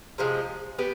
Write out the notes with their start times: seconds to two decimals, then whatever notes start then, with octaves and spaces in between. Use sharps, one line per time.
0.18 C3 F3 G#3
0.78 B3 G4